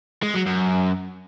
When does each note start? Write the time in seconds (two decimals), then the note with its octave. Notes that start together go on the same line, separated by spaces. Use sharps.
0.23 G#3
0.35 F#3
0.46 F#2